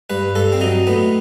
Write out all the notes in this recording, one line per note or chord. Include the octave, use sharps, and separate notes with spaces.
G2 B4
G2 A4
C4
F#3 D#4
A2 B3